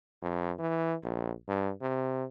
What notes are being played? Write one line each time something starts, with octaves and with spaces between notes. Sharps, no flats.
F2
E3
A#1
G2
C3